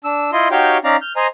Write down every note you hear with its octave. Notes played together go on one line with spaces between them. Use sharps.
D4 E6
E4 F4 D#5 C6
D#4 F#4 G4 C#5 F5 G5
C#4 D#4 D5 F5 A#5
F6 G6
C5 D#5 G#5 A#5